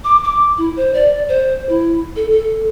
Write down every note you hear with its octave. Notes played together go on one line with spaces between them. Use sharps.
D6
D6
E4
C5
D5
C5
E4
A4
A4